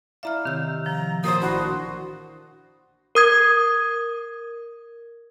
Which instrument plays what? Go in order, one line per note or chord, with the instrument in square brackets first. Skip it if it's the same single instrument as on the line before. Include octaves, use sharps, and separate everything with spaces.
[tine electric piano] E4 D5 F5 [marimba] E5 A#5 F6
[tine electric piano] C3 C#5 E6 [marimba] D#3 G6
[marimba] F3 [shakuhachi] A#5
[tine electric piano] A#2 F#4 A6 [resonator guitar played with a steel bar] F3 C5 [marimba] A#4 [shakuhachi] D#6
[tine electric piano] A1 D4 E4 [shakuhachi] F#4 [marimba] B5
[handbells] A#4 D#6 G#6